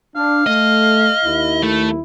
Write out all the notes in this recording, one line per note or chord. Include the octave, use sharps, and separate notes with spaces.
D4 F5
A3 D#5
D#2 E4
A3